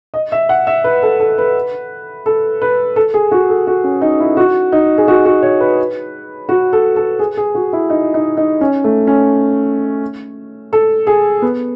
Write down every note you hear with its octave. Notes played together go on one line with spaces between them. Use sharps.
D#5
E5
F#5
E5
B4
A4
A4
B4
A4
B4
A4
G#4
F#4
A4
F#4
C#4
D#4
E4
F#4
D#4
G#4
F#4
F#4
C#5
B4
F#4
A4
A4
G#4
G#4
F#4
E4
D#4
D#4
D#4
C#4
A3
C#4
A4
G#4
B3